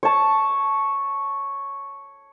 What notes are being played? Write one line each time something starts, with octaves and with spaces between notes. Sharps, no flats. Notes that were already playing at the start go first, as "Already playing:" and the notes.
C#5 A5